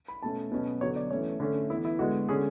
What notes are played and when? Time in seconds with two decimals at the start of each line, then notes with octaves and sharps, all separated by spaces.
0.08 B5
0.23 B2 A3 C#4 A5
0.52 B2 F#3 C#4
0.81 D3 F#3 B3 C#5
0.96 D5
1.11 E3 A3 C#4 C#5
1.40 D3 A3 C#4
1.70 E3 B3 E4
1.85 E4
1.99 D3 G#3 B3 F#4
2.29 D3 G#3 C#4 G#4